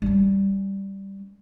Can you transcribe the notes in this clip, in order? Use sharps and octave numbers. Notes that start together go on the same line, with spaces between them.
G3 C#4